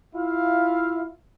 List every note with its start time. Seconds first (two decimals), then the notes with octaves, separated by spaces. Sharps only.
0.15 E4 F4 E5 F5